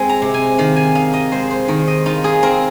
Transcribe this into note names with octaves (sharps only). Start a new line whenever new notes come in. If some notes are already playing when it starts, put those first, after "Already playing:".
Already playing: G#3 C4 G#5
A#5
C3
G#5
D#3 F5
G#5
D#4 F5
D#5
G#3 C5
C5
D#3 A#4
D#5
D#4 F4
G#4
C4 A#4